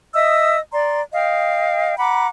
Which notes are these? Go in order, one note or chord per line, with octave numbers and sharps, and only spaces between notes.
D#5 E5 D#6 E6
D5 A#5 C6
D#5 F5 G5
F#5 A#5 B5 D6